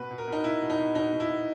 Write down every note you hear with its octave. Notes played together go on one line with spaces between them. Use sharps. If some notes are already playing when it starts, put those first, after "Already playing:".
Already playing: B2 B4
B2
A#4
B2 D#4
B2 E4
B2
D#4
B2
B2 D#4
B2
E4
B2